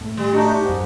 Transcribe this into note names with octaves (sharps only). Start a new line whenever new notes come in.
A2
G3
A3 D4 D#4 F#4 G4
G#2
F#2